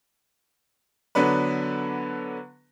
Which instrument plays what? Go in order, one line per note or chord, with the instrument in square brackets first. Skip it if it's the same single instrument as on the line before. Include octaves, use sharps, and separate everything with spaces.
[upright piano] D3 F#3 B3 D4 B4